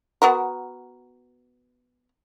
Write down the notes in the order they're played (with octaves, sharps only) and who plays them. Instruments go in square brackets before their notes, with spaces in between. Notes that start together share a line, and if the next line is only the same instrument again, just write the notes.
[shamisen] B3 F#4 A#4